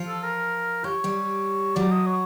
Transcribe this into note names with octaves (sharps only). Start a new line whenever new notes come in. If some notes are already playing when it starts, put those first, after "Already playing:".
Already playing: F3 F4
A4
A#4
G4 C#5
G3 G4
F#3 F#4 D5
D#5
C#5